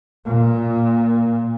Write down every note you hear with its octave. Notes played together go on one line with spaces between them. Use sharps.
A#2